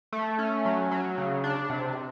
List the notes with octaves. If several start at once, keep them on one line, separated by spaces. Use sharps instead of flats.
A3
C#4
F#3
F#3
C#3
D4
C3